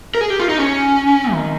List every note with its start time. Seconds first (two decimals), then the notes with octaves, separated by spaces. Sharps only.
0.15 A#4
0.21 G#4
0.30 G4
0.40 F4
0.49 D#4
0.58 C#4
1.33 D#3